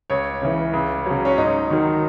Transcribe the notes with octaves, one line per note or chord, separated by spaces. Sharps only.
C#2 C#5
C#3 E3
C#2
C#3 F#3
C#4
G#2 D#4
D#3 F#3